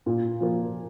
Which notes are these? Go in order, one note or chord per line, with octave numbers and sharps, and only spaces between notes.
A#2
F3 A#3